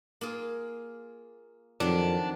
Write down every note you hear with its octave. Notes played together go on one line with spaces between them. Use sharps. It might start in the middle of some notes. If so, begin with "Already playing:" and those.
A#3 F4 G#4
F2 D#3 F3 F#3 D4